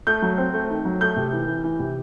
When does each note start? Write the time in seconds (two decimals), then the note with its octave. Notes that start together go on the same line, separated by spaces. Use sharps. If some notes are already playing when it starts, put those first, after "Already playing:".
0.07 A3 G6
0.22 F#3
0.38 C4
0.53 A3
0.70 D#3
0.85 F#3
1.01 A3 G6
1.16 C3
1.33 E3
1.48 E3
1.64 E3
1.79 C3